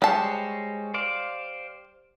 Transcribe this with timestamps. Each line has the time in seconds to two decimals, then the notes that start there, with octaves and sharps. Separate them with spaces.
0.02 G3 G#3 C5 C#5 A5
0.94 C5 D5 F5